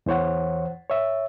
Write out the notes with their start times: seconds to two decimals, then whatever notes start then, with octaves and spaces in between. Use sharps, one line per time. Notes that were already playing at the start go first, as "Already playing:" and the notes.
0.06 E2 E3 C5 C#5 F#5
0.89 C#5 E5